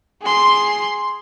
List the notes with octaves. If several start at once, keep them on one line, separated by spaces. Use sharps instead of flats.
G#4 C6